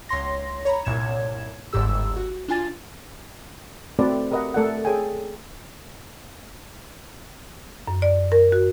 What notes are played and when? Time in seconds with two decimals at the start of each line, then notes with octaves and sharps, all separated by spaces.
0.09 C#2 C#5 C6 A#6
0.65 C#5 A#5 B5
0.85 C2 G2 A#2 C#5 G#6 E7
1.73 G1 C#2 G#2 G4 E6
2.16 F#4
2.48 D4 F4 G#5 A6
3.99 A3 C4 F#4 A4 B4 D5
4.31 G4 A#4 B4 D#5 E5 F#5
4.54 A3 A4 A#4 D5 D#5 F#5
4.85 G#4 A4 C#5 G5 G#5
7.87 F#2
8.02 D5
8.32 A#4
8.52 F#4